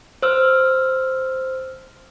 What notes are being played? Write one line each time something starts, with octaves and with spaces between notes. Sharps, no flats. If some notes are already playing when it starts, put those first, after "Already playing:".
C5 E6 F6